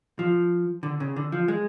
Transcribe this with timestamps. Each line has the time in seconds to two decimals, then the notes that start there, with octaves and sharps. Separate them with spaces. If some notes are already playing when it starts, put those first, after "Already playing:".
0.19 F3
0.83 D3
1.00 C#3
1.16 D3
1.32 F3
1.48 G#3